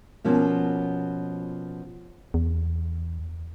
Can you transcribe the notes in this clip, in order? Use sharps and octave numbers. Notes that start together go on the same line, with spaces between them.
B2 F3 A#3 C#4
E2